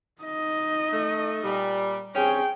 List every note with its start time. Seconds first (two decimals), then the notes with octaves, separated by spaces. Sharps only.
0.22 D#4 D#5
0.93 A3
1.44 A#2 G3
2.15 G2 C4 C#4 G#4 G5